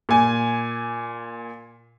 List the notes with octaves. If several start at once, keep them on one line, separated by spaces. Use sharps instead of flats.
A#2 G#5